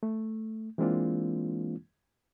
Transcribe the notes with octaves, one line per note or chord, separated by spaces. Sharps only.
A3
E3 G#3 A#3 C4 D4 F4